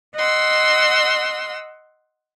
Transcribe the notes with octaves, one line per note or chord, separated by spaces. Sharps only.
D#5 F#5 C6 E6